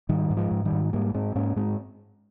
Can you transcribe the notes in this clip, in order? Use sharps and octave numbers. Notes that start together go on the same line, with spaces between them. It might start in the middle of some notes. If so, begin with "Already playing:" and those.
G#2 D#3 G3
G#2
F3 G#3
G#2
D#3 G3
G#2
G#3
G#2 G3 A#3
G#2 G#3 C4
G#2 A#3 C#4
G#2 G#3 C4